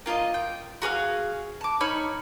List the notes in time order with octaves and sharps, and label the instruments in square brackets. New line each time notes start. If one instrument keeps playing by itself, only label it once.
[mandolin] A#3 F4 A4 D#5
G5
F#4 G#4 D5 F5
A5 D6
D#4 C#5 B5 F6